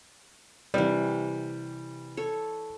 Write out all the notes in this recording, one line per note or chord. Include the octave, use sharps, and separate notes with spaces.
C3 E3 G3
A4 C#5